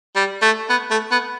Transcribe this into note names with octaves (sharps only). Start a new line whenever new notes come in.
G3
A3
B3
A3
B3